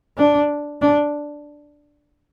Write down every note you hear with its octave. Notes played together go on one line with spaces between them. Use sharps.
D4
D4